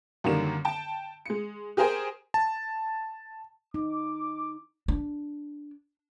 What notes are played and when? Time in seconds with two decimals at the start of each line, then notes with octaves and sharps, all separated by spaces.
0.24 F#2 D3 D#3 G3 A#3 E7
0.65 G5 A5
1.26 G#3 C#7
1.77 G4 G#4 A#4 C5 G5 G#5
2.34 A5
3.74 D#4 D6
4.88 D4